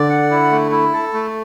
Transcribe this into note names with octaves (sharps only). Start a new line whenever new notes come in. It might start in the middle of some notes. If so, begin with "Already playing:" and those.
Already playing: D3 D5
F#5
E4
A3
E4
A4
A3